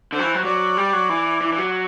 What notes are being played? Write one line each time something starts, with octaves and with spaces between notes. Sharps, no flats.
D3 C5
F#3
E3
F#3
F#3 D5
G3
F#3
E3
E3
E3
F#3